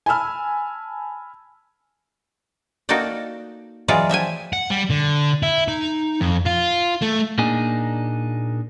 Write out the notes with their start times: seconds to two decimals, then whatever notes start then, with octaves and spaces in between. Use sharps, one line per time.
0.06 G#5 A5 B5 E6 F6
2.89 A#3 D#4 F#4 A4 D5 G5
3.88 E3 F#3 G#3 F4 G#4 D5
4.09 F3 E5 G5 G#5
4.53 F#5
4.70 G3
4.90 D3
5.43 E4
5.68 D#4
6.21 F2
6.46 F4
7.02 A3
7.38 A#2 A#3 D4 D#4 G#4